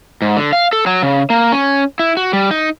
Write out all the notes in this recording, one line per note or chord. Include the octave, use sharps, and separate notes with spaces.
G#2
D3
F5
A4
F#3
C#3
A#3
C#4
E4
F#4
G3
D#4